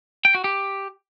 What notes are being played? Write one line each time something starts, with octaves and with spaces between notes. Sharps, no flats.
G5
F#4
G4